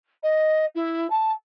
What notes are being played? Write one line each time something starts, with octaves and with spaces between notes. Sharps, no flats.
D#5
E4
A5